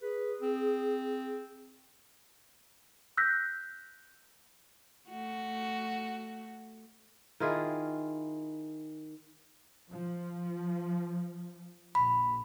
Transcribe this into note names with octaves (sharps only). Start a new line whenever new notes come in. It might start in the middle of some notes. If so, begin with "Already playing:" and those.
G#4 B4
C4
E6 F#6 G6 A#6 B6
A3 F#4
D#3 E4 F4 G#4
F3
A#1 B5